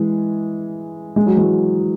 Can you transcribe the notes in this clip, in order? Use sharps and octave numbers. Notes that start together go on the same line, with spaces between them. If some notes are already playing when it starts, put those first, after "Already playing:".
Already playing: E3 G#3
G#3
F#3
E3 G#3